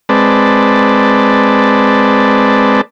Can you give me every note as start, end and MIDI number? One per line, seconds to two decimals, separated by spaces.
0.09 2.81 56
0.09 2.81 60
0.09 2.81 71
0.09 2.81 74
0.09 2.81 81